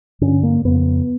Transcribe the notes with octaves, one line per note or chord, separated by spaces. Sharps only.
G2 D3 C#4
A#3
F2 C#3 B3